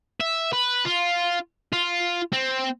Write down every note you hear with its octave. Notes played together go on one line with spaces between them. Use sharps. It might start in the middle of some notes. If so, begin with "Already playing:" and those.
E5
B4
F4
F4
C4